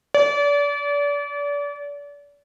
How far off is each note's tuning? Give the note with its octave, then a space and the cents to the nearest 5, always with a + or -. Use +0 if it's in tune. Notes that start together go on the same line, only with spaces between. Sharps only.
D5 -35